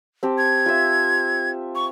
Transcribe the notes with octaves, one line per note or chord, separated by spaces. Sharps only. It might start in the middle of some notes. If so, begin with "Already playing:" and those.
C4 G4 A5
G#6
F4 E5
C#6